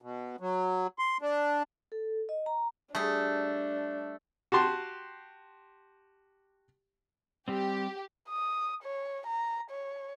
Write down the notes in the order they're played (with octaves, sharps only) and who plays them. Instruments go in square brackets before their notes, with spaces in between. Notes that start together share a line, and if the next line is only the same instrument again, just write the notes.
[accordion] B2
F#3
C6
D4
[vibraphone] A4
D#5
A#5
[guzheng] G3 G#4 [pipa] A3 [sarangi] D4
[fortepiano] F#4 G4 A5 C6
[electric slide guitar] G3 C4 [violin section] G4
[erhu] D#6
C#5
A#5
C#5